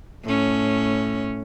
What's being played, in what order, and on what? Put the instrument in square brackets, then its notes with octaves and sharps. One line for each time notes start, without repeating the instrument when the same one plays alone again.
[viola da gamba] A2 C#4